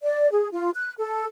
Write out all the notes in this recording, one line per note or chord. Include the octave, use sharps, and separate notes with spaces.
D5
G#4
F4
F#6
A4